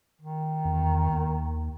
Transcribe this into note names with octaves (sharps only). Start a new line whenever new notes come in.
D#3
E2
D#2